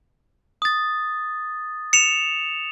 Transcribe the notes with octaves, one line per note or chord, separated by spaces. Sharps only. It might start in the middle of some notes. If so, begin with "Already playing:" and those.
D#6 A6
C#7 E7 F7